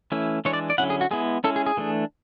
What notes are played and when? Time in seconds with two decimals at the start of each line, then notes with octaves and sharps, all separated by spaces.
0.12 E3 A3 C#4 E4
0.45 E3 G#3 D4 C#5
0.53 D5
0.70 D5
0.78 D3 F#3 C#4 E4 F#5
0.90 G#4
1.01 F#4
1.11 G#3 B3 E4 G#4
1.44 G#3 C#4 E4 A4
1.56 G#4
1.66 G#4
1.77 E3 A3 D4